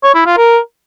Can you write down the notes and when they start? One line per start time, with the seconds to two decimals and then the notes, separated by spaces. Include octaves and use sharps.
0.03 C#5
0.15 E4
0.26 F4
0.38 A#4